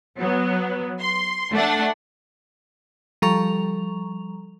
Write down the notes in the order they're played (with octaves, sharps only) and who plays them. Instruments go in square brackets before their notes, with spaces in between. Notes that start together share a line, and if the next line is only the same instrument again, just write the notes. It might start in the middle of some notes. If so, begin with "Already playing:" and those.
[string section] F#3 B3
C6
A3 D4 F#5
[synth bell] F3 G3 A4 A#5 C#6 F7